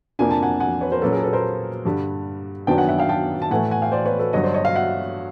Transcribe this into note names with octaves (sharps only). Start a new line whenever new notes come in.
F2 C3 F3 A#3 D4 G#5
A5
F#5 G#5
F#5 G#5
B4 C#5
A#4 C5
A#2 F#3 A#3 C#4 A4 B4
G#4 A#4
A4 B4
A#4 C5
G2 D3 G3
F#2 D#3 F#3 B3 D4 G5 A5
F#5 G#5
E5 F#5
F5 G5
G5 A5
A5
A2 E3 A3 F#5 G#5
F#5 G#5
F5 G5
C5 D5
B4 C#5
A4 B4
G2 D3 F#3 C#5 D#5
C5 D5
C#5 D#5
D#5 F5
E5 F#5